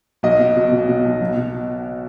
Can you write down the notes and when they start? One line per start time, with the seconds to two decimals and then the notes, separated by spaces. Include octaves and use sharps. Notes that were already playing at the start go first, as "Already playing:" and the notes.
0.23 B1 D#5
0.39 B2
0.56 B2
0.72 B2
0.88 B2
1.05 B1
1.21 B1
1.36 B2